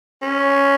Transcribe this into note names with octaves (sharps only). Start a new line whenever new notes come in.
C#4